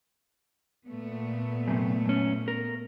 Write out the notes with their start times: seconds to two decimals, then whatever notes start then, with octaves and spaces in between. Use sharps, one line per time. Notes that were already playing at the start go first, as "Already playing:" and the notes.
0.86 A#2 A3 B3
1.68 F#2 C3
2.05 F#2 C#4
2.48 A#4